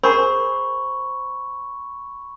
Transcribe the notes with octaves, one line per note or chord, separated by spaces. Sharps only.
G#4 A#4 C5 B5 C#6